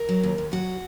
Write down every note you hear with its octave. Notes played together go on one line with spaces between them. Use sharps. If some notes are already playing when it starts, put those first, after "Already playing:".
Already playing: A#4
F#3
D#2
D#2
F#3 F#4